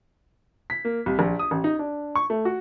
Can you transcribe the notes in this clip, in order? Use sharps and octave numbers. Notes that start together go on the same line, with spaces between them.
B6
A#3
C2
A#1
D#6
A1
D#4
D4
C#6
A3
F#4